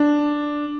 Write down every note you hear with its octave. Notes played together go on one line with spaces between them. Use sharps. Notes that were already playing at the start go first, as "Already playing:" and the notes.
Already playing: D4